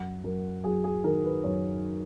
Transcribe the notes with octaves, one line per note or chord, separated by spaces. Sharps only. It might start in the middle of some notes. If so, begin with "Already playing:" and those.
Already playing: F#2 F#5
F#2 A#4
F#3 G#4
G#4
D#3 A#4
B4
F#2 C#5